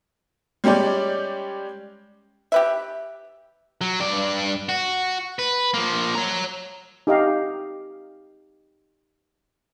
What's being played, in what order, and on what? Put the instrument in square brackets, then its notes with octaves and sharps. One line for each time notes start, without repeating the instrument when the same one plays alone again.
[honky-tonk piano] G3 G#3 C#4 G4 D5
[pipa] G4 B4 E5
[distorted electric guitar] F#3
G2 D5
F#4
B4
F3 A#3
C#5 A#5
[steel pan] D#4 G4 D#5 F5